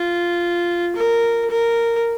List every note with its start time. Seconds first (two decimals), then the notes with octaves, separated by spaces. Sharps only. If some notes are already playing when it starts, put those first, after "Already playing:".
Already playing: F4
0.96 A#4
1.50 A#4